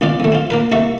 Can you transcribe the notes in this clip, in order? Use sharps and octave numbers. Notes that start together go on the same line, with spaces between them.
C#2 B3 F4 D5
E2 A3
C4 F4
A#3 A#4 B4
C2 A#3 E5 C#6